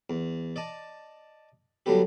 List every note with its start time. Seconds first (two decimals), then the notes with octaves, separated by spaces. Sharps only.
0.10 E2
0.56 D5 D#5 A5
1.86 D3 F#3 G3 A3 B3 G4